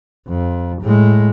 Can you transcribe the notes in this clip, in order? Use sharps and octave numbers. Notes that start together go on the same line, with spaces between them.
F2
A2 G#3